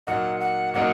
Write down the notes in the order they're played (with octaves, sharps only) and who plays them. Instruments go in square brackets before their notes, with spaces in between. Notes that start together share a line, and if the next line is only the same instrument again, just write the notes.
[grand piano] A#2 F#3 A#3 D#4 [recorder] F#5
[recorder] F#5
[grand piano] A#2 F#3 A#3 D#4 [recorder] F#5